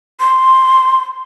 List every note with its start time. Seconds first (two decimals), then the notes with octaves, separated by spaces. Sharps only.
0.20 C6